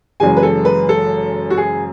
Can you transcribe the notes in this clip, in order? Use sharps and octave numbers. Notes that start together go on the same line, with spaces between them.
F#1 F#2 E3 G#3 G#5
B4
A4
B4
A4
F#4
G#4